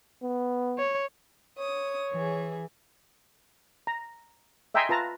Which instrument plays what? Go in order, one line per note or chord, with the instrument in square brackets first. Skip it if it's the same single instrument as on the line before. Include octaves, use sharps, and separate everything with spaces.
[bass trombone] B3
[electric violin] C#5
[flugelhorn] C#5 [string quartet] D#6
[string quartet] E3 G#4
[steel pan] A#5
D#5 E5 G5 G#5 A#5 C6
F4 B4 A5 A#5